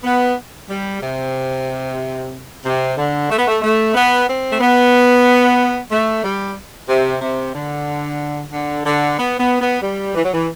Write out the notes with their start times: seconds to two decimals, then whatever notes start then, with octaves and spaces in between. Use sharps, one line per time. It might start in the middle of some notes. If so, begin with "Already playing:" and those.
0.04 B3
0.69 G3
1.01 C3
2.65 C3
2.97 D3
3.30 A3
3.38 B3
3.47 A3
3.62 A3
3.95 B3
4.27 C4
4.51 A3
4.61 B3
5.91 A3
6.24 G3
6.88 C3
7.21 C3
7.54 D3
8.52 D3
8.85 D3
9.17 B3
9.39 B3
9.60 B3
9.82 G3
10.15 E3
10.24 F#3
10.33 E3